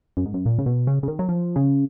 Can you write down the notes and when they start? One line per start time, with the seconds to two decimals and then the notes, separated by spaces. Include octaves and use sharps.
0.17 F#2
0.26 G#2
0.34 F#2
0.46 A#2
0.58 C#3
0.66 B2
0.87 C#3
1.03 C#3
1.08 D#3
1.19 F#3
1.29 F3
1.56 C#3